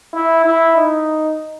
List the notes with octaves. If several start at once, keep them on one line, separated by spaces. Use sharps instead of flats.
E4
E4
D#4